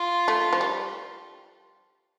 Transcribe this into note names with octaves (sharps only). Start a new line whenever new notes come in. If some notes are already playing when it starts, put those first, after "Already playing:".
Already playing: F4
A3
F3
G3